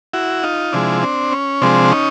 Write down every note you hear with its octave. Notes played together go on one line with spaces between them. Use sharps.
E4 F#4
D#4 F4
C3 F3 G#3 D4 E4
C4 D4
C#4
C3 F3 G#3 C4 D4
C#4 D#4